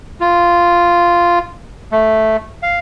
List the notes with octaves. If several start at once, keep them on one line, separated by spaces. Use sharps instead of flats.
F4
A3
F5